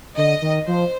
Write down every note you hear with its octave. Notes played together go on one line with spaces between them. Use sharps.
D3 D#5
D#3
F3 C5